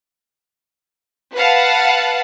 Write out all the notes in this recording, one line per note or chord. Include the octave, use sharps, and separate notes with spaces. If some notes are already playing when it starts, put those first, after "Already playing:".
B4 F5 F#5 A5